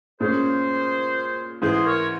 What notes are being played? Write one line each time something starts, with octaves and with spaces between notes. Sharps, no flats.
A#2 G#3 C#4 G#4 C5
G#2 E3 G#3 G#4 C5
A#4 C#5